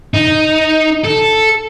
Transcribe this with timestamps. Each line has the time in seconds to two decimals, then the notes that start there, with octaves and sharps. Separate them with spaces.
0.14 D#4
1.04 A4